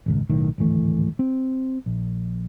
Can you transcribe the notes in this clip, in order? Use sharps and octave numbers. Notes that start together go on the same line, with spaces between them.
D#1 G#1 C#2
B1 A2 D#3
D1 G#1 E3 A3
C4
A#1